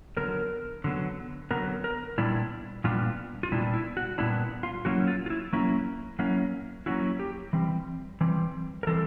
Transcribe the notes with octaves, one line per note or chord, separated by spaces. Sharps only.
D3 F#3 B3 A#4
D3 F#3 B3
D3 F#3 B3 A#4
A#4
A#2 G3 B3 D4 E4
A#2 G3 B3 D4 F4
F4
A#2 G3 B3 D4 E4
E4
F#4
A#2 G3 B3 D4 E4
F4
F#3 A#3 C#4 E4 F#4
F4
F4
E4
F#3 A#3 C#4 E4
F#3 A#3 C#4 E4
F#3 A#3 C#4 E4 F#4
G4
E3 G3 C4
E3 G3 C4
A#4
E3 G3 C4 A4